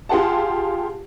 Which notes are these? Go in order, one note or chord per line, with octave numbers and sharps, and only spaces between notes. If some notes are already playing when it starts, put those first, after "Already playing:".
F4 G4 G#4 F#5 A5